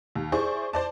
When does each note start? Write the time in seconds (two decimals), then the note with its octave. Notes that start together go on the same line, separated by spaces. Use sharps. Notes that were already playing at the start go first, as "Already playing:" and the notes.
0.15 D#2
0.32 E4 G#4 C5 D5 C#6
0.73 C5 D5 A5